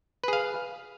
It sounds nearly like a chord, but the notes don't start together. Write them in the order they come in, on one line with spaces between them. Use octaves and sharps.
B4 G#4 F5